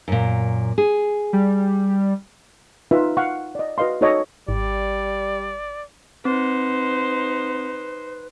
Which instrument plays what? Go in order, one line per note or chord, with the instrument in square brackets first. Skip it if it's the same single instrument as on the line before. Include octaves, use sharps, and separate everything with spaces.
[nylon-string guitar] F#2 A#2
G#4
[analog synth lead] G3
[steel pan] D#4 F4 B4 E5
F5 F#5 C#6
D5 D#5
F#4 B4 D#5 F5 C6
D#4 F#4 A4 C#5 D#5 C#6
[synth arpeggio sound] G#1 [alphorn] G3 [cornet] D5
[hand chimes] C4 [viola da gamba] D#4 C5 [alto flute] B4